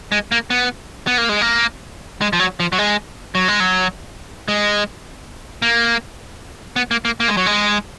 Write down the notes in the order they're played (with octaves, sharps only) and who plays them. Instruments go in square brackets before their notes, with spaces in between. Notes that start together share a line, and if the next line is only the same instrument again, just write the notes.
[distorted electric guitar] G#3
A#3
B3
B3
A#3
G#3
A#3
G#3
F3
F#3
F3
F#3
G#3
F#3
G#3
F#3
G#3
A#3
B3
A#3
A#3
A#3
G#3
F#3
G#3